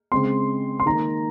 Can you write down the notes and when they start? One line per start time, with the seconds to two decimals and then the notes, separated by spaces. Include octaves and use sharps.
0.12 C#3 G#3 C4 C6
0.80 C6
0.86 D#3 A#3 A#5